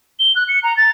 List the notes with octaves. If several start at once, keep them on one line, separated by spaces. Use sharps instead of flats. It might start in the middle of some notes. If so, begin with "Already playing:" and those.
G7
F#6
C#7
A#5
A6